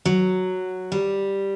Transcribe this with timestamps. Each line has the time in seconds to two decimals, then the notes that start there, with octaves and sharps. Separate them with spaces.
0.05 F#3
0.92 G3